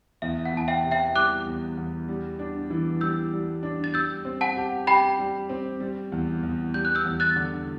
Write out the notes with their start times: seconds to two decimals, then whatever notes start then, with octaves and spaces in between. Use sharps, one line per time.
0.22 E2 E5
0.46 F#5
0.52 E2 A5
0.68 E5 G5
0.84 C3
0.91 E5 G5
1.15 G3 D6 F#6
1.46 E2
1.77 E2
2.08 G3
2.39 D4
2.70 E3
3.01 G3 E6 G6
3.33 G3
3.63 D4
3.84 A6
3.94 G3 E6 G6
4.25 C4
4.41 F#5 A5
4.57 G4
4.87 G4 G5 B5
5.19 G3
5.49 C4
5.80 G3
6.12 E2
6.43 E2
6.74 G3 G6
6.85 F#6
6.95 E6 G6
7.05 E2
7.20 F#6 A6
7.36 D3